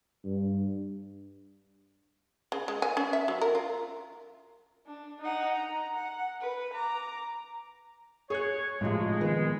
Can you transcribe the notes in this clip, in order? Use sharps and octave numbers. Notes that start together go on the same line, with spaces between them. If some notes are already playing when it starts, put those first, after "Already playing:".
G2
C#3
G#3
G#5
C#4
E5
F#3
A#4
F4
D4
D#4 F#5
A#5
F#5
B4
A#5 D6
G#4 C#5 F#6
G#1 A2 C3 F3 G#3
D#3 F3 B3